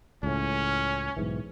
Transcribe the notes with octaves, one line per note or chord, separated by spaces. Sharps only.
C#2 A2 C#4
B1 G#2 E3